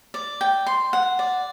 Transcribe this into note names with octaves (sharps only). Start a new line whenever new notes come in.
D5
G5
C6
F#5
D5